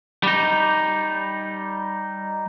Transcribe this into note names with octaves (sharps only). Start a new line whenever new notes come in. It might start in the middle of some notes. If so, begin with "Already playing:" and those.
G3 D#4